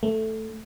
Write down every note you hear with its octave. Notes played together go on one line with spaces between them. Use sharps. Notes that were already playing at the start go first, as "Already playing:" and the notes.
A3